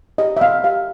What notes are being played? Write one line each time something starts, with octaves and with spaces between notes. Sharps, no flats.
G4 D#5
E5
C4 F5
G4 F5